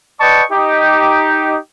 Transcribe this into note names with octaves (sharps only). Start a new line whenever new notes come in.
B4 D5 D#5 G5 A5 C#6
D#4 G4